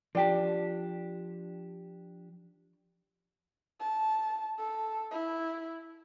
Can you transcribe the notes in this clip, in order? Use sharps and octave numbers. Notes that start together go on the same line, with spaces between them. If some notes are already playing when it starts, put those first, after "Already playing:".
F3 D4 G4 D5 G5 A5
A5
A4
E4